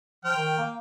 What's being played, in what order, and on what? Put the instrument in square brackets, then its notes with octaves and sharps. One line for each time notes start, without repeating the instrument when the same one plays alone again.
[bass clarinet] F3 [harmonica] G5 F6
[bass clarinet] D#3
A#3